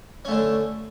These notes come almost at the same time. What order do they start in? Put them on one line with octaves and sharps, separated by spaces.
C#4 A3 D3